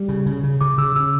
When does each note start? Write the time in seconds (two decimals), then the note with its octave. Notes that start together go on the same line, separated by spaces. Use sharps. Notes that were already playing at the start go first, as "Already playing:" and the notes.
Already playing: G3
0.09 C#3
0.26 C#3
0.44 C#3
0.61 C#3 D6
0.78 C#3 E6
0.96 C#3 E6